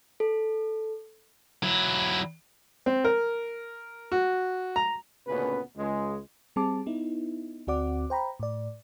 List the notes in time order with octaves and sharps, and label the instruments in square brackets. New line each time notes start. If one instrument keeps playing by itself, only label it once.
[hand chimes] A4
[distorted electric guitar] F#3 E4
[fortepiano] C4
A#4
F#4
A#5
[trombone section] D2 A#2 C#3 B3 C#4 B4
C#2 G#3
[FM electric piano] G3 C4 G#4 A5 D6
B3 D#4 E4
D2 C4 F#4 D5 F#5 D6
C5 G5 A#5 B5
A2 D5